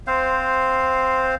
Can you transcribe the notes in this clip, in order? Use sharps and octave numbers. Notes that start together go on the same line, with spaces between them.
C4 C5 F5